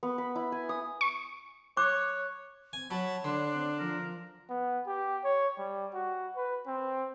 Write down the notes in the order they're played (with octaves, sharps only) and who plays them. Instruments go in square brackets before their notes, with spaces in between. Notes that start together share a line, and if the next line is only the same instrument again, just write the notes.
[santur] B3
B5
E4
G#5
D#6
[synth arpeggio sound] C#6
[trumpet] C#5 [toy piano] D6 [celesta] F#6
[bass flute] C4 [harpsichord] G#5
[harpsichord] F#3 [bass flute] C#5 [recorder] A5 [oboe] B5
[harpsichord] D3 [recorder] D4 [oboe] C6
[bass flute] C4
[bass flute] F3 [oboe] A#4
[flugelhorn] B3
G4
C#5
G3
F#4
B4
C4